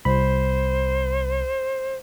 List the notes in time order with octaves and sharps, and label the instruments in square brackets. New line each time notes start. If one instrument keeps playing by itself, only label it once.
[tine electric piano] C2 B5 [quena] C5